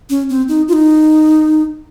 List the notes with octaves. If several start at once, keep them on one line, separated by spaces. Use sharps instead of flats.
C#4
C4
D#4
F4
D#4